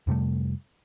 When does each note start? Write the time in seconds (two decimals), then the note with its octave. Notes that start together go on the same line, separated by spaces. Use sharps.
0.07 F2 C3 G3 A3